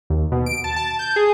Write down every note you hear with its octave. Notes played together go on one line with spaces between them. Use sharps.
D#2
B2
D7
A5
A5
G6
G#4